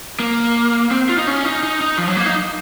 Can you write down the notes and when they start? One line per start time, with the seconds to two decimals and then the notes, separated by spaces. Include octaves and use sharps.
0.20 A#3
0.91 C4
1.09 F4
1.18 D#4
1.27 C#4
1.45 D#4
1.63 D#4
1.81 D#4
1.98 F3
2.08 F#3
2.16 A#3
2.26 D#4